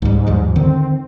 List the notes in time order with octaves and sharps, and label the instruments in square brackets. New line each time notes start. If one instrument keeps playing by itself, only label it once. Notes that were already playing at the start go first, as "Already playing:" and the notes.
[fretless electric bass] C#2 G3 [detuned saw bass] G#2
[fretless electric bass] D#2 F3 G3
[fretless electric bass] D3 D#3 [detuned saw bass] C4